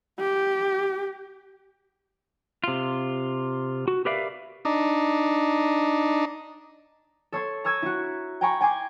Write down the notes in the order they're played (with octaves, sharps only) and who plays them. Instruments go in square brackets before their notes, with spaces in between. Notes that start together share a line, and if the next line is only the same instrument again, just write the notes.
[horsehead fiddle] G4
[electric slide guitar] C3 F4
F#4
G4 A#4 B4 D5 E5 F5
[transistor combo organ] D4 D#4
[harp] A4 C#5 C6
A#5 C#6 E6 G#6 D#7
E4 F#4
G5 G#5 A#5 B5 C#6
G5 G#5 C6 D6 G#6